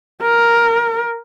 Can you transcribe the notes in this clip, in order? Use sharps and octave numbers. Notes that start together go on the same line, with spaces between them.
A#4